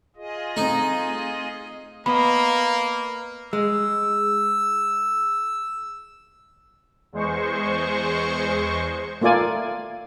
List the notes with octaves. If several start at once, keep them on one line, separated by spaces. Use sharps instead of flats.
F4 G#4 D#5
A3 C4 D#4
A#3 B3 D#5 B5
G#3 E6
E2 G#3 C5 C#6
A3 A#3 F4 D5 G#5